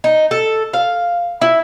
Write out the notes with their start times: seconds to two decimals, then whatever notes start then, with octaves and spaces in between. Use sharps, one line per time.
0.04 D#4
0.31 A4
0.73 F5
1.42 E4